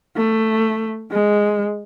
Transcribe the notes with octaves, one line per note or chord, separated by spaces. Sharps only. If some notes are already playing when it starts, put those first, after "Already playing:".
A3
G#3